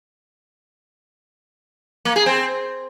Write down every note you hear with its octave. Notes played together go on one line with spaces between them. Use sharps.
A#3
G#4
C4